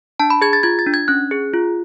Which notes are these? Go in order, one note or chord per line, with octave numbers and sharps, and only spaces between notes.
D4 A5
B5
G#4 G#6
A6
F4 G#6
A6
D4
G#6
C#4 F#6
G#4
F4